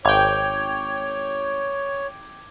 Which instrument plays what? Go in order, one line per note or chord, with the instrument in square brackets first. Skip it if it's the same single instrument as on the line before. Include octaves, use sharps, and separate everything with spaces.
[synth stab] G#1 G5 [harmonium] C#5 [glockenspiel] D6 G#6 F7